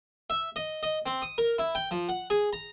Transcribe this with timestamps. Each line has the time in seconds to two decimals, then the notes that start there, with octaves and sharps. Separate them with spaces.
0.30 E5
0.56 D#5
0.83 D#5
1.06 C4
1.22 D#6
1.38 A#4
1.58 E4
1.75 G5
1.91 F3
2.09 F#5
2.30 G#4
2.53 A#5